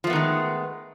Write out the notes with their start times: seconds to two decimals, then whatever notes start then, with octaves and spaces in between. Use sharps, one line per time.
0.04 F3
0.07 A3
0.10 B3
0.13 D#3
0.16 G#3